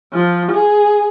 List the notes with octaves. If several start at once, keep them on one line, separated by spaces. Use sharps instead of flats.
F3
G#4